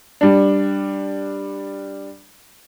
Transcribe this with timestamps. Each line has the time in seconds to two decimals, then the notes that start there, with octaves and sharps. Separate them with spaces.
0.21 G3 D4